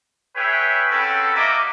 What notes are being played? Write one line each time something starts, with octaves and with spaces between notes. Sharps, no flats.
G#4 B4 C#5 E5 G5
C4 C#4 F#4 A4 B4
A#3 F#4 D#5 E5 D6